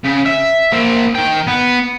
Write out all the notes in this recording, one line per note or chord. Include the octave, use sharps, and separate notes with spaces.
C#3
E5
A#3 C5
D#3 G5
B3